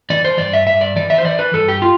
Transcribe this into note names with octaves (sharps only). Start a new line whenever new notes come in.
E3 D5
C5
G2 D5
E5
G2 E5
D5
E3 D5
E5
C5
E3 D5
B4
G2 A4
G4
F4